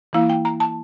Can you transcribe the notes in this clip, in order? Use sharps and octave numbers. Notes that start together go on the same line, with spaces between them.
E3 A#3 E4 F5
G5
A#5
A5